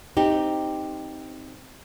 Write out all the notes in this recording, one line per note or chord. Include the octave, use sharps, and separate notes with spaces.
C4 D#4 G4